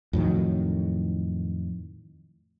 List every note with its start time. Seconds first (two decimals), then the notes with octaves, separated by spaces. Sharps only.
0.13 F2 A2 D#3 F#3